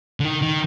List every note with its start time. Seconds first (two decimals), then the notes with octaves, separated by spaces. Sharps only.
0.20 D3
0.25 D#3
0.42 D#3